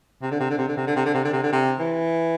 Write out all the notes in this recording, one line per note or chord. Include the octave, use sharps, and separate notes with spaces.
C3
D3
C3
D3
C3
D3
C3
D3
C3
D3
C3
D3
C3
D3
C3
E3